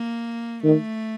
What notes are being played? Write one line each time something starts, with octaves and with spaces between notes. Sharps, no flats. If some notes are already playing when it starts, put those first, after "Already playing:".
Already playing: A#3
D#3 A3